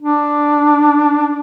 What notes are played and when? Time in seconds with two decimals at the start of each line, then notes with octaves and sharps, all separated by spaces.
0.02 D4